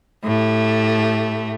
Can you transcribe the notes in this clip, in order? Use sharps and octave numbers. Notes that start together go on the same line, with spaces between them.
A2 A3 G4